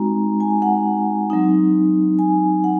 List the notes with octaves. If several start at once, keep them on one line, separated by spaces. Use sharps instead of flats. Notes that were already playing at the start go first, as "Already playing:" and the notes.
Already playing: G#3 C4 D#4 F#4 A#5
G#5
F#5
F#3 C4 D#4
G#5
F#5